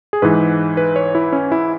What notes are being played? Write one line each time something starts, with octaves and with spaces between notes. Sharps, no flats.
G#4
G#2 E3 B4
B4
C#5
E4
C#4
E4